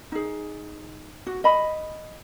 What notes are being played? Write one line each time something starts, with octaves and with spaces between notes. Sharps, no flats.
D#4 G#4
F#4
D#5 B5